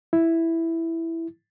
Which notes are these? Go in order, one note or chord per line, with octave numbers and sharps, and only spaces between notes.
E4